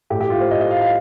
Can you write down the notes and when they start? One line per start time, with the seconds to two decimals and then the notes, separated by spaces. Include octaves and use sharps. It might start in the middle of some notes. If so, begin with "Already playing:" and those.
0.10 A2 G4
0.21 G4
0.30 F4
0.41 C5
0.51 A2 D#5
0.61 D#5
0.71 F5
0.81 F5